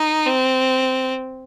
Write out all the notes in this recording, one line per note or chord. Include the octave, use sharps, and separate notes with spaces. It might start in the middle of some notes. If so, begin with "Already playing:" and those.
Already playing: D#4
C4